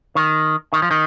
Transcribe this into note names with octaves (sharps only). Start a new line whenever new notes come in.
D#3
D#3
F3
D#3